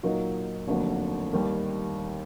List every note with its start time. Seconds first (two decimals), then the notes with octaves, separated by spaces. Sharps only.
0.03 A#2 F#3 A#3 D#4
0.67 F1 D#2 D3 F#3 A#3
1.33 D#2 D#3 G3